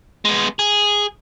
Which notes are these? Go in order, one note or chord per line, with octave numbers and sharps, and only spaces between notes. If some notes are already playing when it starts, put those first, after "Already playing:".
G#3 B3
G#4